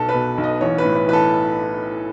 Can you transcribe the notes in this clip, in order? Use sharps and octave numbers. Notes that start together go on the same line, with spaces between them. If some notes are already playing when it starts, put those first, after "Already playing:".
Already playing: B1 B2 A4
B4
B2
B1
D#5
A1 C#5
B4
A2
B4
E3 B4
A4